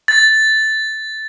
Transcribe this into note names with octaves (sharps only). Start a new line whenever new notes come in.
A6